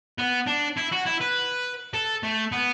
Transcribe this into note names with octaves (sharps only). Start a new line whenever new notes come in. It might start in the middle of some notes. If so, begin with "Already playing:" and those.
B3
D4
E4
F#4
E4
B4
A4
A3
B3